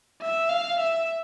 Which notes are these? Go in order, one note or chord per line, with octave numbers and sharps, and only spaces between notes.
E5
F5
E5